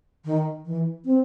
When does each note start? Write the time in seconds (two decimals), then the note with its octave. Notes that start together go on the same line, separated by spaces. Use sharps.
0.25 D#3
0.66 E3
1.05 C4